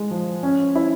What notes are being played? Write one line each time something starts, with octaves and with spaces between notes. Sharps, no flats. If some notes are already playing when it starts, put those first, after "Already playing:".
Already playing: G#3
F3
C#4
E4